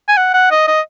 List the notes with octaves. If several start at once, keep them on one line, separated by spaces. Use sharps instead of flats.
G#5
F#5
F#5
D#5
D#5